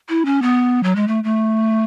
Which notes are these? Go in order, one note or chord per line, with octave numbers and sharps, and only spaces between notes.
E4
C#4
B3
F#3
G#3
A3
A3